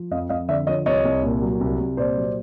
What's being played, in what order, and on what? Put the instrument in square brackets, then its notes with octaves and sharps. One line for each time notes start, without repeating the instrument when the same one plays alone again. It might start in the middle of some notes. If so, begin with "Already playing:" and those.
Already playing: [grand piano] F3
F2 D#5 F5
F2 D#5 F5
D3 D5 E5
F3 C#5 D#5
C2 C#5 D#5
C2
A#2
F#3
C2
C2
A#2 C5 D5
F#3